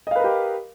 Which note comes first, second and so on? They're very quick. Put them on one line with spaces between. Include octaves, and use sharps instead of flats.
D#5 F5 B4 A#4 G4